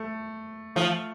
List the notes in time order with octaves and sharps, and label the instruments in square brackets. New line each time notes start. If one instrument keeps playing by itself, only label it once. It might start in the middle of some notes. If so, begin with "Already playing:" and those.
Already playing: [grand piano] A3
[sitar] F3 [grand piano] A3